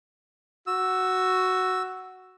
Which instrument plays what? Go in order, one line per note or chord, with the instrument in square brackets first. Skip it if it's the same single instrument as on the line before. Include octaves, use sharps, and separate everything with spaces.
[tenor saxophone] F#4 [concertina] E6